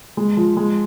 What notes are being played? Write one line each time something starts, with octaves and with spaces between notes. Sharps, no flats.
G#3
F3
G#3